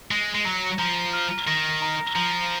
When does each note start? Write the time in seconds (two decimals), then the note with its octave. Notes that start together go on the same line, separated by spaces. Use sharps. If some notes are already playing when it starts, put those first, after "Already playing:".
0.11 G#3 A#6
0.34 G#3
0.45 F#3 A#5
0.79 F3 A#5
1.13 F6
1.47 D#3 A#6
1.82 A#5
2.15 F3 A#5